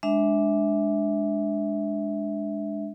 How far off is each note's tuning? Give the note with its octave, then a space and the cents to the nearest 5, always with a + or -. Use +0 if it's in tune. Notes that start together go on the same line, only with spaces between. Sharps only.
G#3 +0 D4 +0 E5 -15